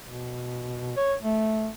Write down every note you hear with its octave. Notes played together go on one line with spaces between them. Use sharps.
B2
C#5
A3